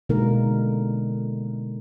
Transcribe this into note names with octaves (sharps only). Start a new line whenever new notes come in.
B2 D3 G#3 A#3 D#4 A#4